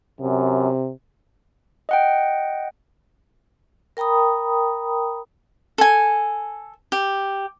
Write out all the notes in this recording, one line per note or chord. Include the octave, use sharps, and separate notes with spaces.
F#2 C3
D#5 F#5 G5
A#4 G5 A#5 B5 D#6
A4 G#5
G4